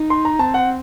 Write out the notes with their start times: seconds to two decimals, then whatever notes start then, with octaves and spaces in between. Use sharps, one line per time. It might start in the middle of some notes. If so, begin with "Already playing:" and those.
Already playing: D#4
0.10 C6
0.25 A#5
0.39 C4 A5
0.54 F#5